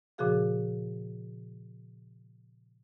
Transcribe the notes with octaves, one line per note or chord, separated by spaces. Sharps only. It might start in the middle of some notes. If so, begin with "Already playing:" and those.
A#2 C#3 F3 F#4 G#4 F5